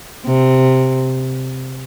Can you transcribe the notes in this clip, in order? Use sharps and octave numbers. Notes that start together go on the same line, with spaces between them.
C3